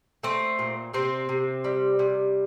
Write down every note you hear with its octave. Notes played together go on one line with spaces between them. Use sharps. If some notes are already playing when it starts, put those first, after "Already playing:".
A3 C4
A#2
C3 C4
C3
G3
C3